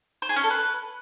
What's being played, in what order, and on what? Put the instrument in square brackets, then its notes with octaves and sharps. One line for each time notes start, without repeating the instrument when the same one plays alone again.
[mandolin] C5
G#4
C#4
A4
B4